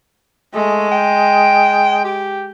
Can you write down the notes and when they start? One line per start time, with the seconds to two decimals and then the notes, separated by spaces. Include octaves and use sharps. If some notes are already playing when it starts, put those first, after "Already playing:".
0.55 G#3 A3
0.91 G5
2.04 G4